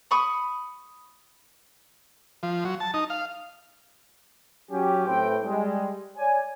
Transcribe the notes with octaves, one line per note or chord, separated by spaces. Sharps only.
B5 C#6 D#6
F3
F#3
A5
D#4
F5
F#3 C#4 G4
A2 C4 B4 G5
G3 G#3
C#5 D5 G#5